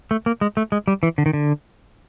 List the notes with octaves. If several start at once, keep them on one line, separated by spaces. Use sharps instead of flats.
A3
A#3
G#3
A3
G#3
G3
E3
D3
D#3
D3